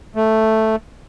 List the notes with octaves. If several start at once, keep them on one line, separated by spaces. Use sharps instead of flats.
A3